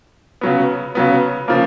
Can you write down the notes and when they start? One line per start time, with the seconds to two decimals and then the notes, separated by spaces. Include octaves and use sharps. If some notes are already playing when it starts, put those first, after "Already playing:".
0.41 C#3 F#3 B3
0.95 C#3 F#3 B3
1.48 C#3 F3 A#3